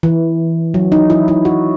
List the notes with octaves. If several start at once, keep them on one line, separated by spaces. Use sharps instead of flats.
E3
F#3
D#4
E4
E4
F#4